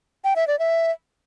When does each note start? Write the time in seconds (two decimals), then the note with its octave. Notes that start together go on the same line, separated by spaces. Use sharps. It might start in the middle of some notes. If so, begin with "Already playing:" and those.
0.24 G5
0.36 E5
0.48 D5
0.59 E5